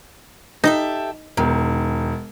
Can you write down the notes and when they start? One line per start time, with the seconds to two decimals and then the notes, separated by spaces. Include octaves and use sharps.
0.64 D#4 G4 A4 E5
1.37 E1 D#3